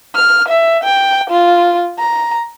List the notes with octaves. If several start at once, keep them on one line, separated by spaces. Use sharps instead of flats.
F6
E5
G5
F4
A#5